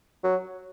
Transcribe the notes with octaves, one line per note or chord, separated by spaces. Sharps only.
F#3